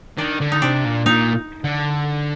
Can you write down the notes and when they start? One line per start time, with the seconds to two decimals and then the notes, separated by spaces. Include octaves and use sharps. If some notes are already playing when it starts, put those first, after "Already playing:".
0.18 D#3 D4
0.41 D3
0.52 D#4
0.62 C3 D4
0.85 A#2
1.06 A#2 D#4
1.64 D3